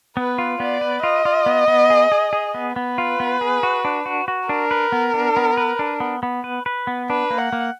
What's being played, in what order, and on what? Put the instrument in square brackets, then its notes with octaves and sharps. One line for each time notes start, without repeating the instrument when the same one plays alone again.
[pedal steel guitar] B3 [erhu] B4
[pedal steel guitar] F4
[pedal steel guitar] B3 [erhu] D5
[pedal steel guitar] B4
[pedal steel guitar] F4 [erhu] D#5
[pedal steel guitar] F4
B3
B3
G#4
G#4
G#4
B3
[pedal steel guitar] B3 [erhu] B4
[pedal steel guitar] F4
B3
G#4
F#4
D4
F#4
F#4
[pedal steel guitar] D4 [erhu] A#4
[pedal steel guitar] B4
B3
D4
B3
B4
D4
B3
B3
B4
B4
B3
[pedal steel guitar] D4 [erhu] B4
[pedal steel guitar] A#3
[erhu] F#5
[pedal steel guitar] A#3